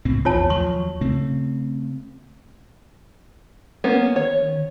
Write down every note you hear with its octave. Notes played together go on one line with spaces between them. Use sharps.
C#2 A2 C4
A#1 E2 F4 C#5 A5
D#2 F3 F#3 C#6
C#3 A3 C4
A#3 B3 C#4
D#3 C#5